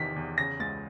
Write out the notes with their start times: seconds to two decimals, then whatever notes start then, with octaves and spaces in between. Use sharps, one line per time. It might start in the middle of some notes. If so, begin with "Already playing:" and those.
Already playing: E2 C3 D#3 B6
0.16 E2
0.38 C#3 A#6
0.60 C#2 A6